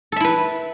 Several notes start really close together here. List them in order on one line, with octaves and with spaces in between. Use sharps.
A4 E5 E4 B4